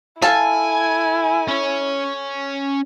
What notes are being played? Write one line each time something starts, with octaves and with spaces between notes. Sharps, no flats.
E4 A4 F5 G#5 A5
C#4 C#5